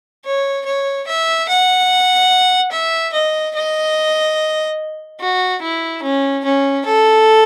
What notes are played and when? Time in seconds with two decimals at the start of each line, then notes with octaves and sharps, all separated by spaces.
0.25 C#5
0.66 C#5
1.07 E5
1.49 F#5
2.72 E5
3.13 D#5
3.55 D#5
5.20 F#4
5.62 E4
6.03 C#4
6.45 C#4
6.86 A4